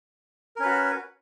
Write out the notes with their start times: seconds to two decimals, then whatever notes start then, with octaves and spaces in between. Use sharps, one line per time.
0.56 A#4
0.59 C#4
0.62 B4
0.65 F#4